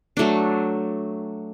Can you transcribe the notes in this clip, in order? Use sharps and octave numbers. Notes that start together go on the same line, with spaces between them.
F#3 A3 D4